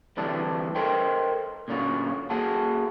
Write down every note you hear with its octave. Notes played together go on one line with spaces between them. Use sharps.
D2 C3 E3 G3 D4 A4
A4 A#4 C5 D#5 G5
A#2 D3 C#4 F4 F#4
A#3 F#4 G#4 A4 F#5 A5